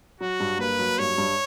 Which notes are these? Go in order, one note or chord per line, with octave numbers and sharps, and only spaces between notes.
F#3 F#4
G2
A#3 B4
F#3
G2 C#5
G2